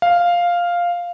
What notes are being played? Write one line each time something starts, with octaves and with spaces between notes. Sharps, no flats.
F5